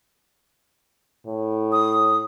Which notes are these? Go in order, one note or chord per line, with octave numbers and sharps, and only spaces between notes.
A2
D#6